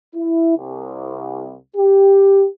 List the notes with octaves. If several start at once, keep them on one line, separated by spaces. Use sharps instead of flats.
E4
C2
G4